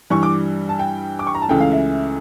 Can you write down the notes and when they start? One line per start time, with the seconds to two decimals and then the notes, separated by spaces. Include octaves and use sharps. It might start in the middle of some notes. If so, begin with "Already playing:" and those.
0.10 G2 E3 G3 C#6
0.23 D6
0.69 A5
0.79 G5
1.19 D6
1.27 C#6
1.35 A#5
1.42 A5
1.49 C#2 C#3 E3 A3 G5
1.60 F5
1.72 E5